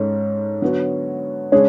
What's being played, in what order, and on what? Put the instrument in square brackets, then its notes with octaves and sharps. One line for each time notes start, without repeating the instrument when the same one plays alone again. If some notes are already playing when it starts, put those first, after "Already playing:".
Already playing: [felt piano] G#2 G#3 C#4 A4 [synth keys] C#5
[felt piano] D3 F#3 B3 F#4
[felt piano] C#3 G#3 D4 G#4 [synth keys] C#5